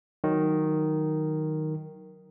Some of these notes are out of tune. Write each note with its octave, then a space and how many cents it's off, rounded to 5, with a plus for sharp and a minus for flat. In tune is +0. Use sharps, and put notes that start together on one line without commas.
D#3 +0 F#3 +0